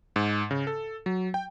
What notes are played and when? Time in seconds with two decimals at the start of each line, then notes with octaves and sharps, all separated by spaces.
0.16 G#2
0.51 C#3
0.67 A4
1.06 F#3
1.34 G5